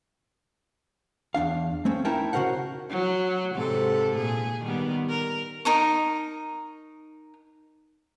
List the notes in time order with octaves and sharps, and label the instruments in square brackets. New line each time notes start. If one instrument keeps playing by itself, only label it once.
[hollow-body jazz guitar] E2 D4 F5
A3 C4 C#4
C#4 D#4 E4 A#4 G5 A5
C#3 F#4 A#4 C5 F#5
[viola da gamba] F#3
G#2 C3 A4
A#2 G#4
D#3 G3 B3
A#4
[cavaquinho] D#4 A#4 C#6